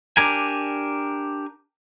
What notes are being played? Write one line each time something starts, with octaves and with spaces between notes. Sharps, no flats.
D4 G4 A#4 G#5